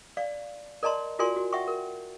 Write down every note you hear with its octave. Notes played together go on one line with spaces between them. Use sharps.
D5 F5
A#4 D5 D#5 A5 A#5 C6
F4 F#4 A#4 D5 G#5 C6
F#4
E5 F#5 G5 C#6
A#4